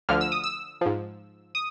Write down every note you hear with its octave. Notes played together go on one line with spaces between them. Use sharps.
D2 D3 F3 F6
E6
D#6
E6
G#2 F3
D#6